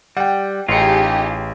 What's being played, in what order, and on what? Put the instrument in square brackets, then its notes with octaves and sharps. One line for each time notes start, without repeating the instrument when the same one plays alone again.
[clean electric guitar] G3 [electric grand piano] F#5 G5
[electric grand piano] A1 C#7 [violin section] D#4 G4 G#4 [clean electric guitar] F4